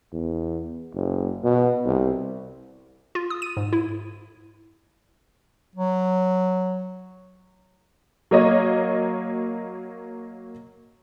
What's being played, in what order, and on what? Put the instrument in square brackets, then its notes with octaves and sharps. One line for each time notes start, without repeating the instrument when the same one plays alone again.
[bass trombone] E2
F#1
B2
C2
[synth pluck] F4
D#6
D#7
G#2
E4
[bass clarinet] F#3
[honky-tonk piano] F#3 A#3 C#5 D#5